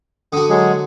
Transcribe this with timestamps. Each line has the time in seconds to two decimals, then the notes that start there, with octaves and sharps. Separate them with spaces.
0.33 D3 F#4 D#6
0.50 F#3 G#3 G#4